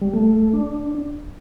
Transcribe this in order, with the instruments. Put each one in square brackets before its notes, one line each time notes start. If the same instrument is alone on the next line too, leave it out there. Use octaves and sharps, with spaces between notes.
[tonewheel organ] G3
A3
D4